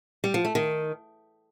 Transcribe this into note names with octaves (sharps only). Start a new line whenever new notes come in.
G3
F3
A3
D#3